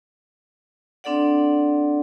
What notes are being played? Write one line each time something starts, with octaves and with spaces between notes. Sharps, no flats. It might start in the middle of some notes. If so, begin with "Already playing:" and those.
C4 D4 A4 D5 F#5